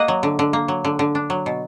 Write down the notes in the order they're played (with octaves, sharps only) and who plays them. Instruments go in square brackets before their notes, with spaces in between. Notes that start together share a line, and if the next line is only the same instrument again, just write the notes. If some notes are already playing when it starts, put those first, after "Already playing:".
Already playing: [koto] A#3 D#5 F#5
F#3
D3
D3
A#3
F#3
D3
D3
D4
F#3
B2